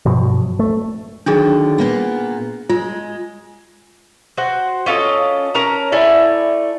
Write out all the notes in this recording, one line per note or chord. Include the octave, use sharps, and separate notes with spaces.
G2 B2 F3 F#3
A3
D3 D#3 F#3 D4 G#4
A#2 A#3 B3
G#3 F4
F#4 C5
C#4 F4 A4 D#5
C#4 A#4 A5 A#5
A3 E4 D5 G#5